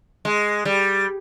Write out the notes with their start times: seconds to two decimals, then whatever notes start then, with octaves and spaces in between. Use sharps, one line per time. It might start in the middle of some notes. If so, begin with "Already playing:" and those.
0.25 G#3
0.65 G3